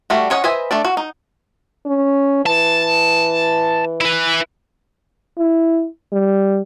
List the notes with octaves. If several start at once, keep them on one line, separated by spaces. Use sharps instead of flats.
G3 A3 F#4
C#4 C#5 D#5 F#5
B4 C5 D#5 E5 G#5
A3 D4 D5
F#4
D#4
C#4
E3 A5
E4 B4
E4
G3